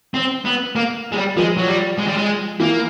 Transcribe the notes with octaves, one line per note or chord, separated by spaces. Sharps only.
C4
B3
A#3
G#3
G3
F3 G#3
F#3
G3
G#3
G3
G#3
E3 A#3